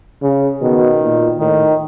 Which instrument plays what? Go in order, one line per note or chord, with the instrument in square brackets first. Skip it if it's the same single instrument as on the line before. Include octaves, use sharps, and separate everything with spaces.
[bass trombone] C#3
[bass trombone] B2 [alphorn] D#3
[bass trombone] A#2
[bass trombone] A2 [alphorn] D#3